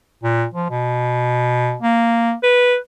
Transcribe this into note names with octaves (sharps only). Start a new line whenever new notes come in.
A#2
F3
B2
A#3
B4